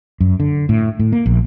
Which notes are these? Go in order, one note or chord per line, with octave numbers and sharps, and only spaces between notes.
F#2
D3
A2
A2
A#3
A#1